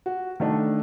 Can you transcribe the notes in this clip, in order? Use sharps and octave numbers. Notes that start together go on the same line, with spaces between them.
F#4
D#3 A3 D4